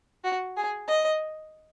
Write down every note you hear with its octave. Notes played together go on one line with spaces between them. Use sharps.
F#4
G#4
D#5